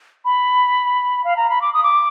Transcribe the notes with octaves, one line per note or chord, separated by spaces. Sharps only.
B5
F5
A#5
B5
D6
D#6
D6